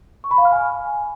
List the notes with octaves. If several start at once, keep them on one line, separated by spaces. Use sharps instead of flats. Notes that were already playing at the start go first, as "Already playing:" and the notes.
C#6
B5
F5
F6
G#5